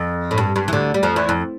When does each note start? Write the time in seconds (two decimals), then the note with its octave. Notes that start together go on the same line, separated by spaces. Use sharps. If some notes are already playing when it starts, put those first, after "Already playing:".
Already playing: F2
0.31 A2
0.38 G2
0.56 G2
0.68 E3
0.73 D2 D3
0.94 G3
1.03 F2 F3
1.16 E2 E3
1.29 F2